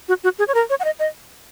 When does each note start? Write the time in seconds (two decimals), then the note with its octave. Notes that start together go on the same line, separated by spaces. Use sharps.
0.09 F#4
0.24 F#4
0.39 G#4
0.48 C#5
0.54 A#4
0.70 C#5
0.80 F#5
0.85 D#5
0.99 D#5